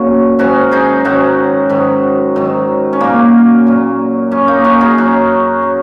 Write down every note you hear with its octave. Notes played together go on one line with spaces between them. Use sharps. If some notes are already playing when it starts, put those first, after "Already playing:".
Already playing: A#2 F#3 C#4 F#4
G#2 D#3 F#3 C#4 F#4
D#4 G#4
G#2 D#3 F#3 C#4 F#4
G#2 D#3 F#3
G#2 D#3 F#3
C#4
A#2 F#3 A#3
A#2 F#3
F#2 F#3 C#4
A#3 D#4
C#4 F#4
D#4 G#4
F#2 F#3 C#4 F#4
F#3